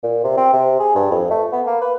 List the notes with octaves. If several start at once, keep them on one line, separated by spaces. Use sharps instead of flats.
A#2
C3
C4
C3
G#4
G2
F2
A3
B3
A#3
B4